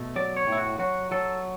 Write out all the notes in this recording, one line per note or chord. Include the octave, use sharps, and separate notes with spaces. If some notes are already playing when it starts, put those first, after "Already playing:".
Already playing: B2 A3
F#3 D5
C#5
A2
E4
F#4
F#3 F#4
F#3 A4